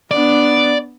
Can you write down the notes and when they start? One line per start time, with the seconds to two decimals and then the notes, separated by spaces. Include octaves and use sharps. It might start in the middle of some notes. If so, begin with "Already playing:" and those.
0.11 B3 D4 D5